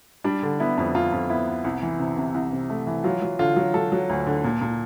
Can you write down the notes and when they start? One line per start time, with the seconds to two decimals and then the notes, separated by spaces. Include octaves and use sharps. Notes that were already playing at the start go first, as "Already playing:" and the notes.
0.24 G3 D4
0.43 D3
0.60 B3 E4
0.78 F2
0.95 F2 F4
1.12 F2
1.30 B3 E4
1.47 B3
1.64 C2
1.83 E3
1.99 C3
2.17 C3
2.34 C2
2.52 C3
2.70 A3
2.87 E3
3.04 F#3 F4
3.22 F#3
3.39 D3 F4
3.56 F#3
3.74 F#3 A4
3.92 F#3
4.09 D2
4.26 D3
4.44 A#2
4.61 A#2